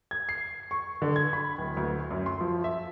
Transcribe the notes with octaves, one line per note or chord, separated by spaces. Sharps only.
G#6
C7
C#6
D3
G#6
B5
D1
D2
F#2
C6
F3
E5